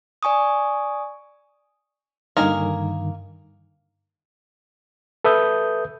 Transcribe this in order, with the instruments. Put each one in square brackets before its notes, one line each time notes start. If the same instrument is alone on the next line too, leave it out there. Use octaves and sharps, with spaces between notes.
[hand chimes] D5 G#5 C#6 D#6
[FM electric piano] G2 D3 D#3 [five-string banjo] A#3 D#5 G#5
[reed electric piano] A4 B4 E5 D#6 G6